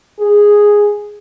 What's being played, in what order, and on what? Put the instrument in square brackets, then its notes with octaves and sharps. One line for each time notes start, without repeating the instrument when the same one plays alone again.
[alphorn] G#4